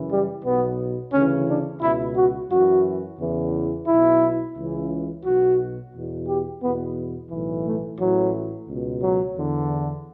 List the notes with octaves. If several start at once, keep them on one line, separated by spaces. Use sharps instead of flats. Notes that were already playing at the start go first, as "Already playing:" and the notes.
Already playing: F#2 C#3 E3
G3
B1 B2 B3
D2 C#3 E3 C#4
D4
C#2 B2 E4
F#4
F#2 E3 F#4
E2 C#3 E3
B1 B2 E4
C#2 C#3 E3
B1 B2 F#4
E2 B2
G4
E2 B2 B3
B1 A2 E3
A3
A1 A2 E3 F#3
C#2 B2
F#3
E2 D3